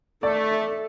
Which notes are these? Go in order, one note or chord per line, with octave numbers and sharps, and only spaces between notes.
A3 A4 D5